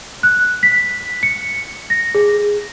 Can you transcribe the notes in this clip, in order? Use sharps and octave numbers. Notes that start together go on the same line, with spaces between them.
F#6
B6
C#7
A#6
G#4